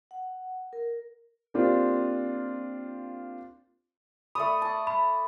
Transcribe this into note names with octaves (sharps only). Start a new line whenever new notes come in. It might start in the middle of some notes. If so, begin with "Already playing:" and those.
F#5
A#4
A#3 C4 D4 F4 G4 C5
A3 D5 B5 D#6
A5
B5